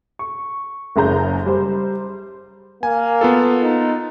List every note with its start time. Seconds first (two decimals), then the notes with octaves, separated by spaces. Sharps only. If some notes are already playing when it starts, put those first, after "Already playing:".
0.19 C#6
0.96 F#1 F#2 G#3 A#5 G6
1.46 G3 C5
2.83 A#3 G#5
3.21 B3 F4 A4
3.63 D#4